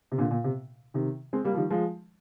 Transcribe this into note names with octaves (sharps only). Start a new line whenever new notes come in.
C3
A#2 D3
A#2
C3
C3 D#3
G#3 C4
G3 A#3
F3
D#3 G3
F3 G#3